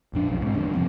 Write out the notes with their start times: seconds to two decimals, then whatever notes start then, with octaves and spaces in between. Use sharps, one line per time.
0.13 A#1 F2 D4
0.29 B1 F2
0.42 G#2 C4
0.55 A1 E2 G2 D3
0.75 F2 C3 F3 C4